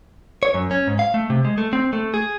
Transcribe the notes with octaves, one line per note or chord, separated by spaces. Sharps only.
C#5
F#2
C#4
G#2
F5
A3
C3
G#3
A3
C4
A3
G#4